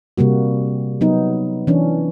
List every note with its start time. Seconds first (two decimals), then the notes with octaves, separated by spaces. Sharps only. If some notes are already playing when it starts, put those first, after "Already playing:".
0.18 C3 G3 A#3 F#4
1.01 F#3 B3 D#4
1.67 E3 C#4 D4